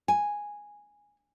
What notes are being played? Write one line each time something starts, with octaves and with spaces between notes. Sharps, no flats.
G#5